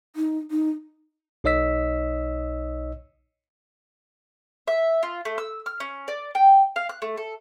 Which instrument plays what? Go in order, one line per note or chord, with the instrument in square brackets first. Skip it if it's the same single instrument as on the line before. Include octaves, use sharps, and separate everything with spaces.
[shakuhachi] D#4
D#4
[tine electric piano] B1 D#4 C#5 D#5 E6 B6
[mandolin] E5
F4
A3
E6
F6
C#4
D5
G5
F5
F#6
A3
A4